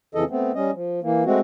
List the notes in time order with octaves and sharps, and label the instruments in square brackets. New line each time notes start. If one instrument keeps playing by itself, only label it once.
[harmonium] F2 C#3 E3 A4 D#5
A3 B3 C4
G3 C#4 D#5
F3
E3 A#3
G#3 A3 C4 F#4